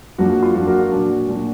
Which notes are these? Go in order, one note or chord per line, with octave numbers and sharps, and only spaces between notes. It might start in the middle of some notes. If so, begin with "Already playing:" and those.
F#2 F3 A#3 D4 F#4
F#4
F4
F#2 F3 A#3 D4 F#4
F#4 A#4
F#4
A#2 F#3 D4
A#2 F#3 D4